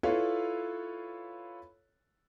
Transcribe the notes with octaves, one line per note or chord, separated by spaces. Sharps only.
E4 F4 A4 B4 C#5 F5